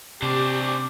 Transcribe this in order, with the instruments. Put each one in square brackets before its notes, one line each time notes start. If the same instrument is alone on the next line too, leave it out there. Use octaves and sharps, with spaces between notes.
[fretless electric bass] C3 [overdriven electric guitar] D4 C5 [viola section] G4 [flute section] D6